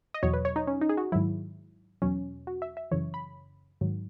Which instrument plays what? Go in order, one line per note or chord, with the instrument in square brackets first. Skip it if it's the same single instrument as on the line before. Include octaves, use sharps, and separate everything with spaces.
[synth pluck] D#5
E2 B2 F#3 C#5
B4
C#5
D#4
C#4
D#4
G#4
F#4
G#2 D#3 F#3 E4
E2 B2 F#3 C#4
F#4
E5
E5
F#2 C#3 E3 C#5
B5
G#2 D#3 F#3